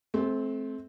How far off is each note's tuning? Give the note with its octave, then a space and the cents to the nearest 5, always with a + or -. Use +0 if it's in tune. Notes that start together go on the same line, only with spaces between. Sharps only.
A3 -35 C4 +5